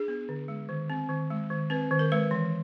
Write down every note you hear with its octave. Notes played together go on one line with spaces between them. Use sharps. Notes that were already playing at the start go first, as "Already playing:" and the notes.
Already playing: D4 G#4
B3
D3
G#3
D#3
C4
D#3
G#3
D#3
C4 B4
D#3
A#4
G#3 B4
E3